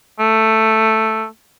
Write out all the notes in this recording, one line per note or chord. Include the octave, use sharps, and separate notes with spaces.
A3